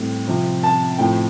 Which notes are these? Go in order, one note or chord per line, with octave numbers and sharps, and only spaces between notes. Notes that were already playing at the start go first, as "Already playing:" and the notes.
Already playing: A2 G3 C4
C3 F3 C4
A5
A2 F3 A3 C4 G5